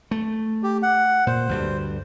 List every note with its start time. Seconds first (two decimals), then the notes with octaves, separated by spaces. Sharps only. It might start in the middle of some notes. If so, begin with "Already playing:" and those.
0.11 A3
0.63 G4
0.83 F#5
1.27 A#2 C5
1.49 D2 G2 G3